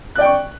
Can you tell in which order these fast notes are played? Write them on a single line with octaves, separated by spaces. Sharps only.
F#6 D5 G5 C#6